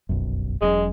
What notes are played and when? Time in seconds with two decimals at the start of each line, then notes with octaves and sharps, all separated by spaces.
0.09 F1 B1 F#2
0.61 E1 F#3 G#3 C#4